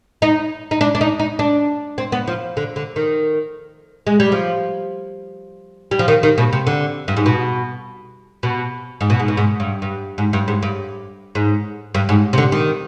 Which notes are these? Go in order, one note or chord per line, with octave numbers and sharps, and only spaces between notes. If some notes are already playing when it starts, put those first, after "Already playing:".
D#4
D#4
D4
D4
D#4
D#4
D4
C4
B3
F3
D3
D3
D#3
G#3
G3
F3
G3
F3
D#3
D#3
B2
C3
D3
G2
G#2
B2
B2
G#2
B2
G#2
B2
G#2
G2
G2
G#2
G2
G#2
G2
G#2
G2
G#2
C3
D3
D#3